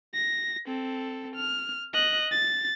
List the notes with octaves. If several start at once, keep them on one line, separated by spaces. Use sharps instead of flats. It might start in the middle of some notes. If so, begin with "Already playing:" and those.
A#6
C4 A4
F6
D#5 F#6
A6